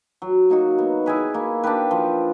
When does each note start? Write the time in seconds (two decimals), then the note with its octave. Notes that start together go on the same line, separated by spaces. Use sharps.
0.22 F#3
0.50 A#3 D#4 F#4
0.78 B3
1.06 E4 G#4 B4
1.34 A#3
1.63 D4 G4 B4
1.91 F3